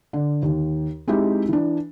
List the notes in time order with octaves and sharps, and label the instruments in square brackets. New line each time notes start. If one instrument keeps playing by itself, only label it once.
[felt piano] D3
D#2
G#3 C4 D#4 E4 G4
E3 D4